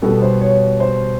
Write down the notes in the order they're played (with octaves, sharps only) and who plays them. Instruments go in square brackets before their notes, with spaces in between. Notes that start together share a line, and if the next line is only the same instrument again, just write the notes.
[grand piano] B2 G3 B3 A4
C5
C#5
C#5
C5